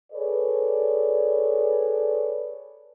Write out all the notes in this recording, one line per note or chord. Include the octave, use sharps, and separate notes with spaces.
G#4 A4 B4 C#5 D5